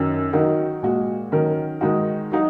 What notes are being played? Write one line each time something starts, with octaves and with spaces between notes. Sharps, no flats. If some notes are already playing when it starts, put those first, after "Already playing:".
Already playing: F#2 D#3 F#3 C#4
D#3 F#3 D#4 F#4 A#4
A#2 G#3 F#4
D#3 F#3 C#4 A#4
D#3 G#3 D#4 F#4
F#3 D#4 F#4